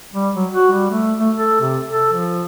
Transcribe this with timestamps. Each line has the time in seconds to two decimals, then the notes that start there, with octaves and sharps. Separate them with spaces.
0.14 G3
0.36 F#3
0.53 F#4
0.72 G3
0.91 A3
1.19 A3
1.36 A4
1.61 C3
1.90 A4
2.13 F3